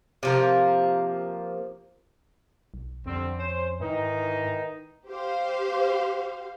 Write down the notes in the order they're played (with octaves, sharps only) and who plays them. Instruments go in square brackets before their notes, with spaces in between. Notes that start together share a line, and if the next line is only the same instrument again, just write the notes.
[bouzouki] C3 F3 A#3
[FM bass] B1
[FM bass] F2 [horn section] D3 G3 C4
[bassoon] C#4 [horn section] C5
[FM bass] G#2 [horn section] D#3 D#4 [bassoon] E3
[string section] G4 C5 F5